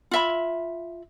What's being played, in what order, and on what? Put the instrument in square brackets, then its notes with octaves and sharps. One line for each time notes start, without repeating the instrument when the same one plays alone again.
[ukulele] F4 E5 B5